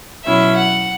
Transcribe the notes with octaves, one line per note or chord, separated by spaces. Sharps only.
B2 F#3 C#4 E4 E5
F#5